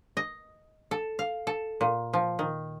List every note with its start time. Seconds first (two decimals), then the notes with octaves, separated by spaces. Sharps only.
0.17 D#5
0.91 A4
1.19 F5
1.47 A4
1.81 A#2
2.13 F3
2.39 D#3